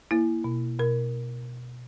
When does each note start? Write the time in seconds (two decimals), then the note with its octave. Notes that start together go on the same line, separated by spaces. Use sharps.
0.11 A#3 E4
0.44 B2
0.79 B2 A#4